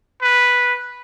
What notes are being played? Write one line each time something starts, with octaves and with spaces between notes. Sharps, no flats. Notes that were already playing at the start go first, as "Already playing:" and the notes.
B4